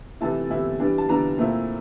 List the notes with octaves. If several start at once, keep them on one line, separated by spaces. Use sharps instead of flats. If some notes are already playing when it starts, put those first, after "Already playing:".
C3 E3 A3 E4 A5
C3 E3 A3 E4
E3 G3 D4
A5
E3 G3 D4 A#5
A#2 A3 C4 E4